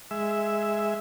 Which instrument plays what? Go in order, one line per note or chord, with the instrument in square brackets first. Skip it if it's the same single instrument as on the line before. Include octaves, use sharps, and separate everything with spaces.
[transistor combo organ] G#3 E5